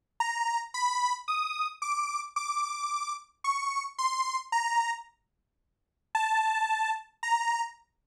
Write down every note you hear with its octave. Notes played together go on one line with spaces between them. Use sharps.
A#5
B5
D#6
D6
D6
C#6
C6
A#5
A5
A#5